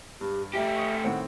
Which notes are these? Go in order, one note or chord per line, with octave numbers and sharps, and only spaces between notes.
G2 G4
A3 G4 E5
C#6 D#6 C#7
A2 D#3 C4 F#5